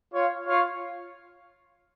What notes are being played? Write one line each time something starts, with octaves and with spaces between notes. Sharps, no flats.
F4 C#5 F5
F4 C#5 F5